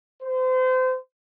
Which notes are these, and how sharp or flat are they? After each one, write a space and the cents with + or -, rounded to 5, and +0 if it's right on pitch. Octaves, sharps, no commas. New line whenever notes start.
C5 -30